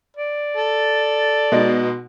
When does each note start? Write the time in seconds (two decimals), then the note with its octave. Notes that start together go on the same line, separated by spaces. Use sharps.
0.17 D5
0.57 A4
1.52 B2 G#3 D#4